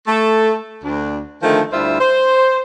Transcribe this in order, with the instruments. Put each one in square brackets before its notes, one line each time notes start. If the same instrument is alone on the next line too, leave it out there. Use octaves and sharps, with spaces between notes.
[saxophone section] A3 A4
D2 D4
D3 D#3 F3 G#3 A3
D2 G3 E4 F4 C5 E5
C5